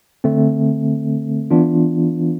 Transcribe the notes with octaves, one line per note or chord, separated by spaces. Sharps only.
D3 A3 C4
E3 B3 D4 F4